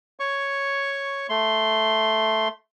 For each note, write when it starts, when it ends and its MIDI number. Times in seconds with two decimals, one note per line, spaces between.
0.20 1.27 73
0.20 1.27 85
1.29 2.48 57
1.29 2.48 84